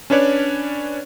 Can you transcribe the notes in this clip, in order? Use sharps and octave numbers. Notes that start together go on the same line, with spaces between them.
C#4 D4 B4 C#5 D5